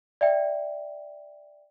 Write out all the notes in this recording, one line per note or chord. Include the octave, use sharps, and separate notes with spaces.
D5 E5 G5